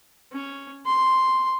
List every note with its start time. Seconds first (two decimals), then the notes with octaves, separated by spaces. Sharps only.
0.33 C#4
0.86 C6